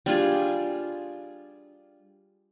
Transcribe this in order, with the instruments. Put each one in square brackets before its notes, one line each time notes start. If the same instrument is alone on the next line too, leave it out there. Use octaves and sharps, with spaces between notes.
[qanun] G3 D4 F4 G#4